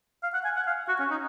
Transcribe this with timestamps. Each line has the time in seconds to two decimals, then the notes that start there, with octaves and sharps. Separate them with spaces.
0.23 F5
0.34 F#5
0.45 G#5
0.56 F#5
0.67 F5
0.88 F#4
1.00 C#4
1.11 D#4